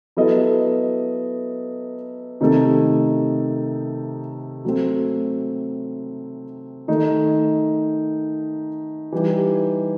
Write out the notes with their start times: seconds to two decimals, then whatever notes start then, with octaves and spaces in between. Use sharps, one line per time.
0.16 F#3 B3 E4 A4 D#5
2.41 C3 D#3 A3 D#4 A4
4.65 F#3 A3 C4
6.88 D#3 A3 D#4
9.12 E3 G3 D#4 G4